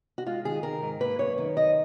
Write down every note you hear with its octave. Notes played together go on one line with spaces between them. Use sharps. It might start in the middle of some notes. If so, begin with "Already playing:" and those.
F#4
G#3 F4
D#3 G#4
D#3 A#4
G#2
A#3 B4
F#2 C#5
D#3
F#2 D#5